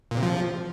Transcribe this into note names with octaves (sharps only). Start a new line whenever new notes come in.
A#2
C3
F3